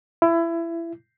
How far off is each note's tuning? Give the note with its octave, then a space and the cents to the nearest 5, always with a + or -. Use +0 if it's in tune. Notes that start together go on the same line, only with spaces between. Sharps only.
E4 +25